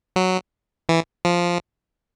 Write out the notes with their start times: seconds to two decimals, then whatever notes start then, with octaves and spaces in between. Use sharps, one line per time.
0.16 F#3
0.89 E3
1.25 F3